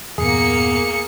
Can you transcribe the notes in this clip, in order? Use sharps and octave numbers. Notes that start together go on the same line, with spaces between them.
E2 G2 A#2 A#3 B3 G#4 C#7